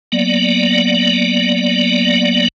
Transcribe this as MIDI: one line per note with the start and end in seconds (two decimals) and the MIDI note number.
0.12 2.48 54
0.12 2.48 58
0.12 2.48 59
0.12 2.48 74